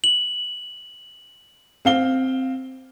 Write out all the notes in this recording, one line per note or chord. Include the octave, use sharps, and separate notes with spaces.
F#7
C4 F5 G7